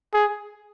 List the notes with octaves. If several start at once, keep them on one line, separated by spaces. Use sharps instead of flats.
G#4